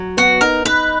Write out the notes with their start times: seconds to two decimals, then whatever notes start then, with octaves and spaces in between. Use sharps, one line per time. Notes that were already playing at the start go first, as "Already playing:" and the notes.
Already playing: F#3
0.17 B3 F#4
0.41 D#4 A#4
0.65 D#4 B4